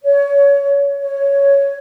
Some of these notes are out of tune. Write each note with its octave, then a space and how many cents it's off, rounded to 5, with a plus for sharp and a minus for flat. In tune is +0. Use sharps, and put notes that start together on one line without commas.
C#5 +25
C#5 +5